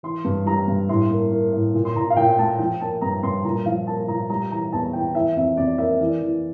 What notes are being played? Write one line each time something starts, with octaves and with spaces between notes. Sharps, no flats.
E3 C6
G2
G3 A#5
G2
A2 C6
A#3
A#3
A2
A#2
C6
A#2 A#5
F5
A#2 G5
A3 A5
F3 G5
A#3 A5
G2 A#5
G2 C6
A#2 A#5
F3 F5
A#3 A5
A#2 A#5
G3 A#5
E3 A#5
E2 A5
E3 G5
E3 E5
F2 E5
F2 D5
A#3 E5
E3 D5
E3